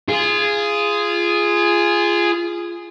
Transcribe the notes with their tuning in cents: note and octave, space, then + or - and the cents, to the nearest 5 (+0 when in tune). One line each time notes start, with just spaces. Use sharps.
F4 -20 G#4 +0